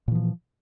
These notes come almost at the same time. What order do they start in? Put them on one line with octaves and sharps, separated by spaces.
A#2 E3 F3